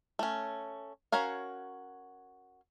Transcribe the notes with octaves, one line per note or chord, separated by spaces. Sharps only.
A3 C#4
C#4 F#4 A#4 C#5 F5